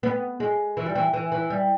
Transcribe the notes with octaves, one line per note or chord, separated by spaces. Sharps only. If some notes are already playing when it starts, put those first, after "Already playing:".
B3
G#3
E3
G3
E3
E3
E3
G3